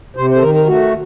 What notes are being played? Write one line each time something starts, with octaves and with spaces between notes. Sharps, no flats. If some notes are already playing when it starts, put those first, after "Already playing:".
C3 C5
C5
A4
D#3 A#4
A#4
A3 F#4